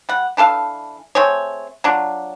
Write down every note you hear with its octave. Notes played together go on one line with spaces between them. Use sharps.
G3 F#5
E3 D4 A4 F5
A3 C4 G#4 C#5
F#3 D4 F4